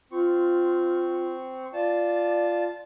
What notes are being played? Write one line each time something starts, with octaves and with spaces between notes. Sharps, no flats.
C4 F4 C#6
F4 D5 A5